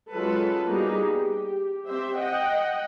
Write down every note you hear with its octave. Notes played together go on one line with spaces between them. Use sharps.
F#3 G#3 C#4 F4 A4 B4
G3 A#3 B3 D#4 F#4 G#4
G4
C4 G4 C5 E5
D#5 F#5 G5